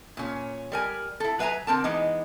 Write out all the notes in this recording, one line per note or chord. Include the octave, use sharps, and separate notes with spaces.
A#2 C#4
G3 A#4 G#5
E4 A4
F#3 B4 E5 G#5 A#5
D3 C4 A#4 A5
E3 G#3 B3 D#4